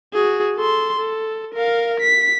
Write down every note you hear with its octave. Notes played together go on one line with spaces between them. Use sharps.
F#4 G#4
A4 C6
A4
A#4 F5
B6